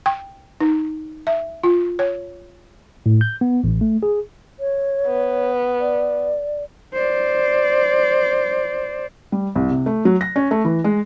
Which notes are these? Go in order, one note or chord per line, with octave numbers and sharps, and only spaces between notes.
G5
D#4
E5
F4
C#5
A2
G6
B3
A1
A3
G#4
C#5
B3
D5
C5 D5
G3
C2
C3
A3
F#3
A#6
C#4
A3
E3
G#3